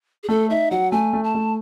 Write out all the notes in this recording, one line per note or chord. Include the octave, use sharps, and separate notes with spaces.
G#4
A3 A4
D#4 E5
F#3 F#5
A3 G#5
A3
A5
A3